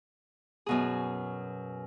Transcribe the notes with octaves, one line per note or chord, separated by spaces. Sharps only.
F#2 B2 G#4